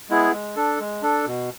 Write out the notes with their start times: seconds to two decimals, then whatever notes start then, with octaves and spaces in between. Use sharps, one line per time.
0.09 G#3 B3 E4 G#4
0.32 G#3
0.56 D4 A4
0.79 G#3
1.02 D4 A4
1.26 B2